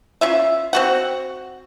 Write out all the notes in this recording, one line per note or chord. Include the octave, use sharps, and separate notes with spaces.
C#4 F4 E5
C4 F#4 F#5